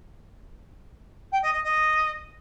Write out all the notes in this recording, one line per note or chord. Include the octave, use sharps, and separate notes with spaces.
G5
D#5
D#5
D#5